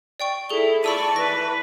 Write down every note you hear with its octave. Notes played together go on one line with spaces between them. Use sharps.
D5 G5 C#6
E4 G#4 A4 G7
D5 A5 B5 C#6 E6 D#7
E3 B4 A#6